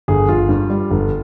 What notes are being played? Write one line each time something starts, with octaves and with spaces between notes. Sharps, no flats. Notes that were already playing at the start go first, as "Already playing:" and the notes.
G1 G#4
G1 F4
G2
G3
G1